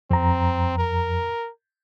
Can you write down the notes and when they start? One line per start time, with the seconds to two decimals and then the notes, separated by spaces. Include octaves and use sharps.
0.11 F2 C4 A#5
0.79 A#4